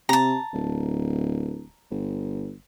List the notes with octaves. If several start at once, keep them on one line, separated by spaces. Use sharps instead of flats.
C3 A5 A#5
D1
G1